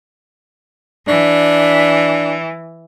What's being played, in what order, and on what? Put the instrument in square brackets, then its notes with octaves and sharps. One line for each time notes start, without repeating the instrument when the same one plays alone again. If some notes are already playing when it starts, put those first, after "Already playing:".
[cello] E3 [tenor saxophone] D4